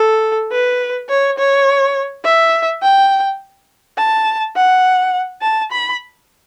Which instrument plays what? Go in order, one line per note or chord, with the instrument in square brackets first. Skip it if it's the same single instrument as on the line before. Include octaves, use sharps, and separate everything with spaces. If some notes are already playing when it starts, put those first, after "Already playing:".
Already playing: [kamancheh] A4
B4
C#5
C#5
E5
G5
A5
F#5
A5
B5